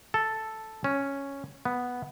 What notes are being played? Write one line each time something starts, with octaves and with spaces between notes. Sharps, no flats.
A4
C#4
B3